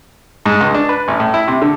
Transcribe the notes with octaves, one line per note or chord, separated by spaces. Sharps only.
G#2
C#2
D4
B4
A1
A2
E4
C3
D3